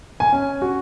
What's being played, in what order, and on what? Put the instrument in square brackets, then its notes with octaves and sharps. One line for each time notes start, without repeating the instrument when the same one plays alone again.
[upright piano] G#5
C#4
F#4